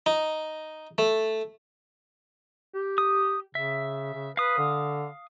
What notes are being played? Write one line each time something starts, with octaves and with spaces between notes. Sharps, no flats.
D#4
A3
G4
D#6
C#3 E5
C#3
B4 F5 D#6
D3